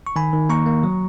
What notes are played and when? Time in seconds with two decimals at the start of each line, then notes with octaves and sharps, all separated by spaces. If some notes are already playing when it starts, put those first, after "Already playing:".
0.07 C#6
0.16 D#3 G#5 B5
0.33 D#3
0.49 A#3 A#5 C#6
0.66 A#3
0.83 F#3